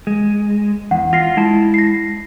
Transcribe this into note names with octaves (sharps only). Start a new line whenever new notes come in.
G#3
E2 F#5
F4 A#6 C7
G#3 E4 A5
A#6 C7